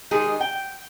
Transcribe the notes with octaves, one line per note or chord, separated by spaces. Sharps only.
D#3 G#3 D#4 G4 G#4
G5